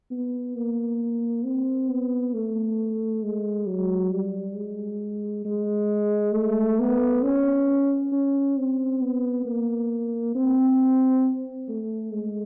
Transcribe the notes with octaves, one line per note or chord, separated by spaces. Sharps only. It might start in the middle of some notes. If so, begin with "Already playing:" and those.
B3
A#3
C4
B3
A3
G#3
F#3
G3
G#3
G#3
A3
B3
C#4
C#4
C4
B3
A#3
C4
A3
G#3